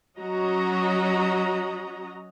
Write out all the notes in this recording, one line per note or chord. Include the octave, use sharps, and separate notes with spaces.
F#3 C#4 F#4 D#5 A#5